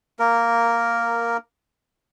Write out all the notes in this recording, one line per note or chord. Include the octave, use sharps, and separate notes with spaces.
A#3 A#4